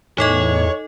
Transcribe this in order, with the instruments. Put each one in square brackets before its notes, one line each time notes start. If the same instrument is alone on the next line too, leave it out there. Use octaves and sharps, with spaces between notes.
[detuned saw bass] E2 [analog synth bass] A2 [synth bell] D#4 A4 D#5 [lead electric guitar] C#5